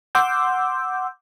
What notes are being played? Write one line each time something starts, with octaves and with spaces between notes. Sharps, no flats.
F#5 C6 D6 E6 G6